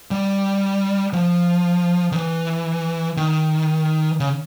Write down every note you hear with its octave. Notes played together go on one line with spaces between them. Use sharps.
G3
F3
D#3
E3
D#3
C#3